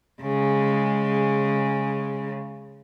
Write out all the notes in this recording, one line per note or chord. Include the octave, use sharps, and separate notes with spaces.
C#3 G#3